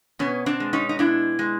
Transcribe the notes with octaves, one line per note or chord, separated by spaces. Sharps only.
B2 B3 C#4
C4 D4
G#3
C#4 D#4
D#4
B2 D4 E4
G#3